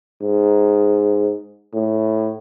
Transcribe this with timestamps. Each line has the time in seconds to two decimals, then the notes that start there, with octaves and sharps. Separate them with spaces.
0.22 G#2
1.74 A2